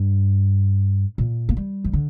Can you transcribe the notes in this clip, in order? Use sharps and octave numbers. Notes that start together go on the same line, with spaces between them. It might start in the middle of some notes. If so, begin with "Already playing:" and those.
Already playing: G2
A#2
A#3
G3
F3
D3